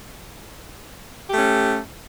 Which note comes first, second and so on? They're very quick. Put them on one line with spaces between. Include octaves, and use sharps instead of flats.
G4 A3 C#4